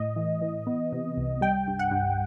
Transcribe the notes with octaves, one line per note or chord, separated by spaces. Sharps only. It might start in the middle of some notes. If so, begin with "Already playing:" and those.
Already playing: A2 D#5
E3
E3
B3
C3
C2
G3 G5
G2
F#5
G2